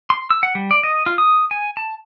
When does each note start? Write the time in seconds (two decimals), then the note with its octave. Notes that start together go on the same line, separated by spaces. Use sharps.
0.10 C6
0.30 E6
0.43 F#5
0.55 G3
0.71 D5
0.83 D#5
1.06 F4
1.18 D#6
1.51 G#5
1.77 A5